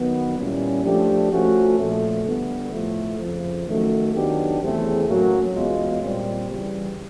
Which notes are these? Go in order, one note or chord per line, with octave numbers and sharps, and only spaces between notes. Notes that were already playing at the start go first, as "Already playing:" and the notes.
Already playing: D#3 F#3 B3
A#2 G3 A#3 C#4 E4
F3 A3 D4 G4
F3 A3 C#4 F#4
A#2 F3 A3
D3 G3 B3
A2 F3 A3
F2 C#3 F3
D#3 F#3 A3 C#4
D#3 F#3 B3 D4 G4
E2 C#3 E3 A3 C4
A2 F#3 A#3 C#4 F#4
E2 B2 G#3 C#4 F4
A#2 G3 C4
C#3 E3 G3